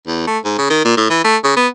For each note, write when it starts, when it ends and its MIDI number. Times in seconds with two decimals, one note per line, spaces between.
0.07 0.25 40
0.27 0.38 57
0.45 0.56 44
0.58 0.67 49
0.70 0.83 51
0.85 0.96 46
0.97 1.07 45
1.10 1.24 52
1.24 1.37 57
1.44 1.52 49
1.57 1.67 59